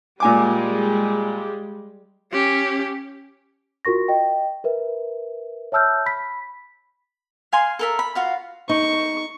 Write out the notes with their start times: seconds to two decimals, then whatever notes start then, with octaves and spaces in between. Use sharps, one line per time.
0.20 A#2 G3 G#3 G#5 D6
2.32 C#4 G4
3.85 F4 F#4 A#4 C#6 A#6
4.08 D#5 G5
4.64 A#4 B4 E5
5.72 C#5 E5 A5 E6 F6 G6
6.06 B5 B6
7.52 F5 G#5 C6
7.79 A4 A#4 E5
7.99 B5
8.15 F4 F#4 F5
8.69 D#4 C#6